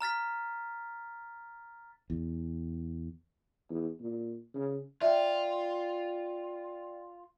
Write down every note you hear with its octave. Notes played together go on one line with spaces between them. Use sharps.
A#5 F6 A6 B6
E2
E2
A#2
C#3
F4 D5 E5 G5